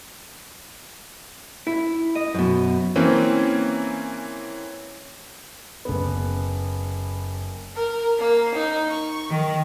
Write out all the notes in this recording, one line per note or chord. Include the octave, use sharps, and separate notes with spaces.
E4
D#5
F#2 B2
E3 A#3 C4 C#4
F#1 B3
A#4
A#3
D#4
C#6
D#3